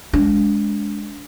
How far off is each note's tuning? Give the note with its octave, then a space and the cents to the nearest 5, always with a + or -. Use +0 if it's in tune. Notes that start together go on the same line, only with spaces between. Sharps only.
G#3 +0 D4 -30